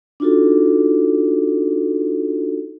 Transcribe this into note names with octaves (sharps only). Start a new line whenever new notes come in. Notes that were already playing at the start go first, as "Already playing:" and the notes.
D4 D#4 F4 F#4 A4